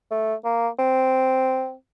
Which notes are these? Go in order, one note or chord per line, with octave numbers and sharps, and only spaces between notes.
A3
A#3
C4